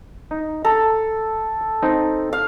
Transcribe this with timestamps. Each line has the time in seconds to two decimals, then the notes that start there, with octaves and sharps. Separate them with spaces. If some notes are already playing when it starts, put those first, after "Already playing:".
0.31 D#4
0.65 A4 A#5
1.82 C4 D#4
2.33 F5